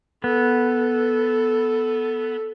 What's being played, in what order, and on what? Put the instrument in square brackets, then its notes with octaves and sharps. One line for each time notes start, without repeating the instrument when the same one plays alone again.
[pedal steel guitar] B3 [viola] A4